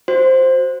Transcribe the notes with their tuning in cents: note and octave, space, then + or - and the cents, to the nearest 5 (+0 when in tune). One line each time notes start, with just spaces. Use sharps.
F#4 +0 C5 +0